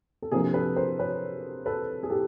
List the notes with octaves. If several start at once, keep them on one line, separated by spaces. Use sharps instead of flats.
A4
C3 F3 A#3 D4 G#4 A#4
A4 B4
A#4 C5
B4 C#5
A4 B4
G#4
G4 A4